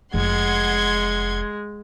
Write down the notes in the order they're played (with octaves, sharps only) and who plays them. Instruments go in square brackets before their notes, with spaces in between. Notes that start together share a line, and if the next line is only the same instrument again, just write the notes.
[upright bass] F1 [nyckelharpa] G#3 [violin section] F#5 C6 G#6